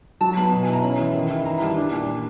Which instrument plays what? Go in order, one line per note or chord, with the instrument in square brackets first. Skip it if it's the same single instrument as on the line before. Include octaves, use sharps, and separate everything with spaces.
[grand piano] F#3 [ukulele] A5
[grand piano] B3 [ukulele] B5
[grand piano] B2
[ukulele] G#5
[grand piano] E4
[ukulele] A#5
[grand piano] C#4 [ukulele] B5
[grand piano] E3
D#3
E4
[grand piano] E3 [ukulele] A#5
[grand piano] G3 [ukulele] A5
[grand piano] D4
A#2